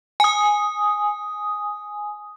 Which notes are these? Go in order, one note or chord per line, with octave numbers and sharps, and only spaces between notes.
G#5 D#6